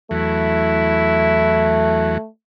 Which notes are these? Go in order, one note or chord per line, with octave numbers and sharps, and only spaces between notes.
E2 F#3 A3 E4